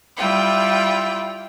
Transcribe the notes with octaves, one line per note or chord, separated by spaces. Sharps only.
G3 E4 F4 G5